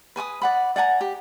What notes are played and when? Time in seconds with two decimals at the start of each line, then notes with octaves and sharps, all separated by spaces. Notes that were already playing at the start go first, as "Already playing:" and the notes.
0.16 B4 G#5 D6 D#6
0.42 D5 F#5 B5
0.76 D5 F#5 G#5 A#5
1.01 G4